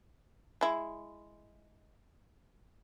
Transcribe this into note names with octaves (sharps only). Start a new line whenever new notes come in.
G#3 E4